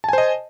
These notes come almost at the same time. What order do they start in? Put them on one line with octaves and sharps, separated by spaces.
A5 G#5 C5 D#5